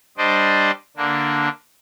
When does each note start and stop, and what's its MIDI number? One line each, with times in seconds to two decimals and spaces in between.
0.18 0.71 55
0.18 0.71 62
0.18 0.71 72
0.18 0.71 74
0.18 0.71 75
0.97 1.49 50
0.97 1.49 58
0.97 1.49 62